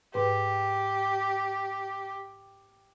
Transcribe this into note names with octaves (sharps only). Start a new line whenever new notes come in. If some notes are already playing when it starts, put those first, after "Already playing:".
G#2 G4 B4